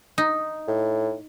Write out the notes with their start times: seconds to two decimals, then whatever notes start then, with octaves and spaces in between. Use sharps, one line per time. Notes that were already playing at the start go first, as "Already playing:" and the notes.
0.18 D#4
0.68 A2